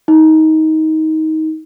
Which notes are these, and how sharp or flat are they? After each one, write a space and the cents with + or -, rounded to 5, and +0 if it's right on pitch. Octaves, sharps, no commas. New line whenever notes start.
D#4 +20